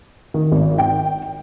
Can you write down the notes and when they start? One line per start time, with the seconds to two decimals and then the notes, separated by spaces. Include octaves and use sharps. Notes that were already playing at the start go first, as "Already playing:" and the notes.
0.34 D#3
0.52 G#1
0.78 G5